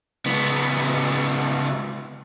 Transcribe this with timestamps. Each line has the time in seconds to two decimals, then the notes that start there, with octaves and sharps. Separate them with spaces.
0.26 C#2 B3